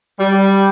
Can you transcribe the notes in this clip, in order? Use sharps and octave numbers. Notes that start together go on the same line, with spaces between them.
G3